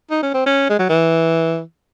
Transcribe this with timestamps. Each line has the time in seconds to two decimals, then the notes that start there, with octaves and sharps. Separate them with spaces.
0.11 D#4
0.23 C#4
0.34 C4
0.46 C#4
0.69 G#3
0.79 F#3
0.89 E3